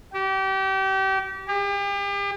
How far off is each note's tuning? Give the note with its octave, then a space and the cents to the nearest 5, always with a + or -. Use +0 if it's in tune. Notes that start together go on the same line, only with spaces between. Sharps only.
G4 -30
G4 +40